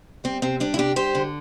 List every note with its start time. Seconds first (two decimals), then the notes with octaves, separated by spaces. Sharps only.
0.24 G3 C4
0.42 C3 C4
0.60 G3 D4
0.74 E4
0.78 C3 D4 G4
0.96 G3 G4 C5
1.15 D3